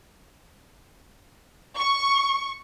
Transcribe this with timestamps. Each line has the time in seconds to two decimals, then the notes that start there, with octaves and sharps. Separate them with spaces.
1.75 C#6